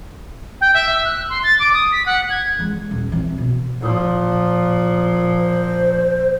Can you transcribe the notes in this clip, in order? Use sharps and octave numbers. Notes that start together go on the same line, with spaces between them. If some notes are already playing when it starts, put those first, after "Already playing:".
G5
E5
E6
F#6
C6
A6
D6
D#6
B6
F#5
G#6
E3 G#3
D#1
E3 C4
B2
A#2 F3
C5